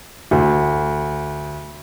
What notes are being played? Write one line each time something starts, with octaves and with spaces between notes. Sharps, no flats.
D2